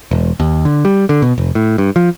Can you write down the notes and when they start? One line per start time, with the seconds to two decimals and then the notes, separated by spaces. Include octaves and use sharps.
0.11 E1
0.40 D#2
0.65 D3
0.85 G3
1.09 D3
1.22 B2
1.38 F1
1.55 A2
1.78 G2
1.96 F3